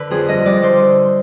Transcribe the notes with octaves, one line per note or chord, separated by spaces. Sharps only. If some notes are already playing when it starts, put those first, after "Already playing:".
Already playing: D3 B4 D5
F2 G#4
G2 D#5
G3 D5
D3 C5